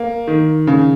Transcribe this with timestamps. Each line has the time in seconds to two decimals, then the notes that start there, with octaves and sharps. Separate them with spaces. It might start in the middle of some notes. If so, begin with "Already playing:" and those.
Already playing: A#3
0.27 D#3
0.67 C#3